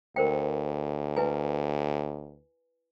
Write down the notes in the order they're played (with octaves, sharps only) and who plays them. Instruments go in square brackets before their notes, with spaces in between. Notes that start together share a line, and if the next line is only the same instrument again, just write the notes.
[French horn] D2 [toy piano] A#4 C5 G5
[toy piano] E4 B4 G#5